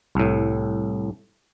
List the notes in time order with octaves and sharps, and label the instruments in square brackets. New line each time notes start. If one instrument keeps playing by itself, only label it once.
[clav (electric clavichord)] C2 A2